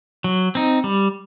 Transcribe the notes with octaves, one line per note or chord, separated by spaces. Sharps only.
F#3
C4 D#4
G3